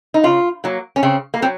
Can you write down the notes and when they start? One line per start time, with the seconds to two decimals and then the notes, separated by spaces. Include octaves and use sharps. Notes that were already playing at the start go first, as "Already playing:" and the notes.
0.14 D#4
0.24 C#3 F4
0.64 F#3 A#3
0.96 C#4
1.03 C#3 C4
1.34 A#3
1.42 F#3 C4